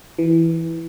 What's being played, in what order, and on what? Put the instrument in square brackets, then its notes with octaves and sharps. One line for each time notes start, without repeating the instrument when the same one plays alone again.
[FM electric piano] E3